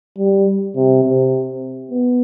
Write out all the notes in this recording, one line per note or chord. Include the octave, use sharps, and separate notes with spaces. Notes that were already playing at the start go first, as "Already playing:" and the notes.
G3
C3
C3
B3